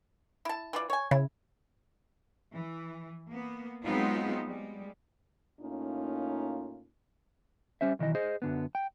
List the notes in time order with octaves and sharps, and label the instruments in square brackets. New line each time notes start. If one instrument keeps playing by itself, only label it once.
[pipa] E4 A5
E3 F4 D5
C#5 G#5
[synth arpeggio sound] C#3 [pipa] E4
[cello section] E3
A#3 B3
F#3 G#3 B3 C4 D#4 F4
G3 G#3
[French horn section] A2 A#3 C#4 D#4 F4
[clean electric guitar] G3 C#4 C5 E5
B1 D#3 E3 D#5
G#4 C5 D#5
F#2 D3 B3
G5